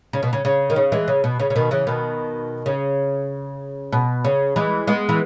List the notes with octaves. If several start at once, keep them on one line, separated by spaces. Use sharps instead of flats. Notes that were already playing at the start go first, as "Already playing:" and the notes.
C#3
B2
C#3
C#3
D#3
C#3
E3 G#3
C#3
B2
C#3
C#3
B2 D#3
C#3 E3
B2 D#3
C#3
B2
C#3
E3 G#3
G#3 B3
E3